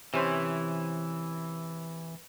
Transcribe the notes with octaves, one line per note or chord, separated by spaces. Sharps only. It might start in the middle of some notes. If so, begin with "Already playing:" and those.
C3 E3 C#4 C5